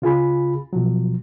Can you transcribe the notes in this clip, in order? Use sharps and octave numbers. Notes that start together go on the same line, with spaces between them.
C#3 F4 G#4 B5
B2 F3 F#3